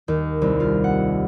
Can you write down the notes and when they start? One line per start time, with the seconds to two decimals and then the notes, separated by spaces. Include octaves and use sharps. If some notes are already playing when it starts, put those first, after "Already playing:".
0.08 D#2
0.42 C2
0.60 F4
0.84 F#5